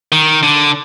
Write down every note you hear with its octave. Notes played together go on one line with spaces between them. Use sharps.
D#3
D3